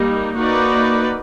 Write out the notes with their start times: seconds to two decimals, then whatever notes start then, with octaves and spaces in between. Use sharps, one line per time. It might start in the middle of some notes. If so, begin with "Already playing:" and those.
Already playing: G3 A#3 D#4
0.37 A#3 D#4 F#4 B4 D5